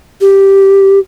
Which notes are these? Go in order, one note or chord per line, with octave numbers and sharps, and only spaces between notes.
G4